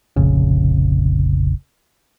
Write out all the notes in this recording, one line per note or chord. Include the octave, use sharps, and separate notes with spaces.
F1 A#1 C#3